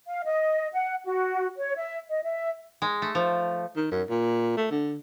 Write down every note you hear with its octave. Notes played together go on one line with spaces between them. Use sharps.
F5
D#5
F#5
F#4
C#5
E5
D#5
E5
G#3
A3
F3
D#3
F#2
A#2
A3
D3